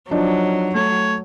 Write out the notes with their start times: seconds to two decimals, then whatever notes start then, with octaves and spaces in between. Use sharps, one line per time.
0.11 F3 F#3 D4 D#4
0.75 A3 C#5